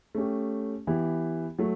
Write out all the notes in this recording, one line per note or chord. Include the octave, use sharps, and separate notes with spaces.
A3 C#4 G4
E3 B3 E4 G4
F#3 A3